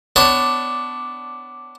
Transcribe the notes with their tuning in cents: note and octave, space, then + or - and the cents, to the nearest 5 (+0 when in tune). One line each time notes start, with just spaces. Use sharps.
B3 +25 D4 +0 C#5 +0